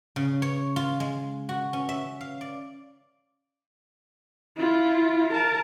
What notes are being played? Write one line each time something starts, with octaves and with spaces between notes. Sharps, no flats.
C#3
C#5
F4
G#3
F#4
C#4
E5
F5
D5
E4 F4
A#4 A5